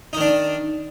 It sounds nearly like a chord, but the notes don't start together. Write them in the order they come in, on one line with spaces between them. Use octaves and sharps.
D#4 D#3 D4